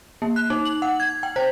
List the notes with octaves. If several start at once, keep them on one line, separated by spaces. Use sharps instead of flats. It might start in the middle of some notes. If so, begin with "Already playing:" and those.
A#3
F#6
D#4
F#7
F#5
G#6
G5
C5